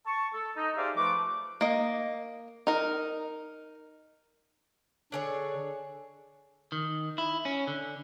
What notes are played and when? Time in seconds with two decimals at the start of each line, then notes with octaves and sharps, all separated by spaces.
0.06 A5 C#6
0.33 A4
0.56 D#4
0.76 G4 G#4 C5 D5 E5 F5
0.97 F3 A3 B4 D6
1.61 A#3 D#5
2.67 D#4 A#4
5.12 D3 D4 G#4 A4 C#5
6.72 D#3
7.18 E4
7.45 C#4
7.67 D3